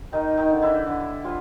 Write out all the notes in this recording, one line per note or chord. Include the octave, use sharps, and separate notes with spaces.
D#3 G3 D#4
D#3 D#4
D3
E3 E4
D3
F3 G3 F4